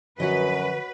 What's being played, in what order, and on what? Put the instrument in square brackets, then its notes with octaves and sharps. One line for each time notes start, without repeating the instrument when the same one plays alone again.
[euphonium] F#2 [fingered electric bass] D3 F3 [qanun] F#4 C#5 D#5 [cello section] B4